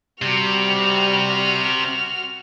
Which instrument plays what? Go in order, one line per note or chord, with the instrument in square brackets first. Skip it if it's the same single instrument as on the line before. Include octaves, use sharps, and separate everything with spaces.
[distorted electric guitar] C3 [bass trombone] G3 [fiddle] F#4 F6